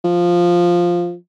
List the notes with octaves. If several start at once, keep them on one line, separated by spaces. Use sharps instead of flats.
F3